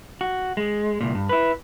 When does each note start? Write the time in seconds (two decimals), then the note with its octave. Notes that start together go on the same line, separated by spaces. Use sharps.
0.21 F#4
0.57 G#3
1.01 C2 A#2
1.15 G2
1.29 E4 B4